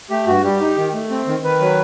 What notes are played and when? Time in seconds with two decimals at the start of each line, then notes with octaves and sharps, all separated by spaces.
0.10 A3 G4
0.27 G2 F#4
0.43 G3 G4
0.61 D#4
0.77 D#3
0.94 A3
1.10 C4
1.27 D#3
1.43 D#3 B4
1.60 F#3